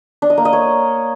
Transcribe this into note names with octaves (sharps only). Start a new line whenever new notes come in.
D4
D#5
A#3
D#5
C#5